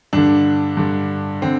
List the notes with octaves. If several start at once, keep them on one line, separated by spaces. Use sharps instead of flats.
G2 D3 D4
G2 D3
D3 C4